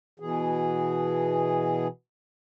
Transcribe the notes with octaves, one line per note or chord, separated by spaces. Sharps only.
B2 E3 G#4